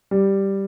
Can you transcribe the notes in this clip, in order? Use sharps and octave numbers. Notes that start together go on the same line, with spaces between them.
G3